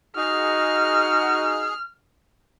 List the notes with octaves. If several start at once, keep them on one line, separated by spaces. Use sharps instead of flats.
D#4 F#4 G#4 F6